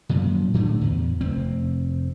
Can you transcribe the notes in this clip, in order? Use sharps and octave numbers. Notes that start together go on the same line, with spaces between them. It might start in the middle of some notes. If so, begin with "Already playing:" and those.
F#2 A#2 F3
A2 D3 F3 A3
E2
F1 C4